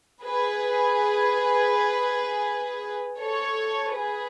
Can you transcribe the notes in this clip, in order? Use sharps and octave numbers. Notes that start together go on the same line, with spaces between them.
G#4 B4
A4 C#5
G#4 B4